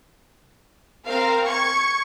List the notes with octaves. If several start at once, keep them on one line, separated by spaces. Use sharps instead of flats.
C4 A#4 F5
C#6 G#6